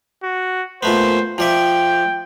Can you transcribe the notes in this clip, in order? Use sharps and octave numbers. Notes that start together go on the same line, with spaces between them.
F#4
A#2 A3 B3 C5
F3 D5 E5 G5